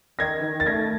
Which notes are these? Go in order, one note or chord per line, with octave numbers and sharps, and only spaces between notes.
D#3 G#6 A#6
D#3
A6
A3 G#6 A#6